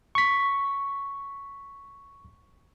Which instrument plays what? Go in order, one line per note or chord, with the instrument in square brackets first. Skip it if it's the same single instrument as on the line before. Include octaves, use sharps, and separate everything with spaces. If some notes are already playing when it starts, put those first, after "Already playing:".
[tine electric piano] C#6 B6